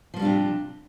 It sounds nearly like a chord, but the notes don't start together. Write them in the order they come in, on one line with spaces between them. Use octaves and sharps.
F3 A#3 G3 D4 C3